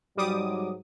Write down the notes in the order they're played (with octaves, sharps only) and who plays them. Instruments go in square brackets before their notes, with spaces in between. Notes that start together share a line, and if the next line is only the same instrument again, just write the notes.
[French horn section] G#2 F#3 [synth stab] G3 D6 D#6